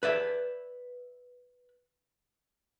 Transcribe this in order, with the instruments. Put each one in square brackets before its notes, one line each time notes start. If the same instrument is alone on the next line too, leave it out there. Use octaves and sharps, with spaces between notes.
[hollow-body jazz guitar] B4 D5 E5